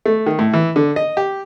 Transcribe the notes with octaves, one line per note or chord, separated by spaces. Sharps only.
A3
D#3
A2
E3
D3
D#5
G4